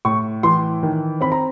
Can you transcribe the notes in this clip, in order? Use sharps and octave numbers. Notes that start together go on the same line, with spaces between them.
A2 C#6
E3 C6
D#3
C4 B5
A#5